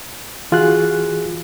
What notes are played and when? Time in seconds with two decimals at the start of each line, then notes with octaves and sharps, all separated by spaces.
0.52 E3 F4 F#4 G#4 F#6